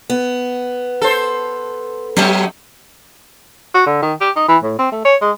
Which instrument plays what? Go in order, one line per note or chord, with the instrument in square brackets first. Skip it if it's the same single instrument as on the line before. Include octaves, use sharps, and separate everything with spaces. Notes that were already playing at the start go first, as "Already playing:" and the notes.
[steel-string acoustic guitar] B3
[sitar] A4 C5
[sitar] F#3 B3 [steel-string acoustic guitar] C#4 G4 E5
[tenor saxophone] F#4
D3
D#3
G4
D#4
E3
A2
C4
A3
C#5
G#3